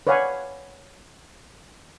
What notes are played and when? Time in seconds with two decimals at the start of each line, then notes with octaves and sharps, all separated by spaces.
0.07 B4 C#5 D5 F5 F#5 G#5